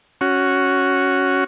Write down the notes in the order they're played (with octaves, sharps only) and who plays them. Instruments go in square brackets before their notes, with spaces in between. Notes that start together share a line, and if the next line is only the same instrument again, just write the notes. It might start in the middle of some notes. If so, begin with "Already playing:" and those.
[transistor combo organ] C#4 F#4